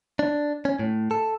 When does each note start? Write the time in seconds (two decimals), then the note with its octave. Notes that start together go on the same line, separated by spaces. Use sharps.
0.19 D4
0.65 C#4
0.79 A2
1.11 A4